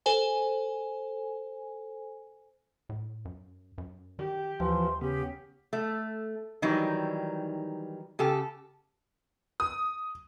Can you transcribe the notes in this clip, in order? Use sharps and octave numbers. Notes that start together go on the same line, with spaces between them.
A4 C5 G#5
A2
F#2
F#2
D#3 G4
D#2 E3 F3 C6
C#3 B3 C#4 G4
A3
D#3 E3 F#3 G3 D#4
C#3 G4 A4
D#6